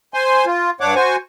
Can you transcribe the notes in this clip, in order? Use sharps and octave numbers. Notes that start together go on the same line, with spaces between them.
C5 G#5 C6
F4
G2 D4 C#5 F#5 D6
F#4 C5 G#5 C#6